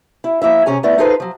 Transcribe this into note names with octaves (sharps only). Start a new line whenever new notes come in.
E4
F3 A#3 E4 E5
C3 C#4 G#4 G#5 A#5
A3 B3 E4 D5
D#4 F4 G#4 A4 B4 C5
F3 F#3